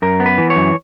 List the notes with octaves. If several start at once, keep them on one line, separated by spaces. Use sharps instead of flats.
F#2 A#4
B3
B4
E3
C#5
F#2